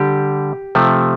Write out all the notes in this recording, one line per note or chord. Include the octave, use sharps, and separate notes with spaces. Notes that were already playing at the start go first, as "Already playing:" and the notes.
Already playing: D3 G3 G4
C3 F3 A3